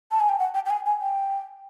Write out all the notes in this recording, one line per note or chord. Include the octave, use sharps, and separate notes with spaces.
A5
G#5
G5
F#5
G5
G5
G#5
G#5
G5